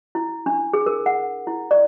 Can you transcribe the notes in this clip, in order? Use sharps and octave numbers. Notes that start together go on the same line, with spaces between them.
E4
D4
G#4
A#4
F#5
E4
D5